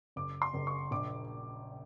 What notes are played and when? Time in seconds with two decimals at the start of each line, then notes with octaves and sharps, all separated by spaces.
0.16 F#1 D6
0.42 C6
0.54 F#1
0.67 C#6
0.91 A#1 D6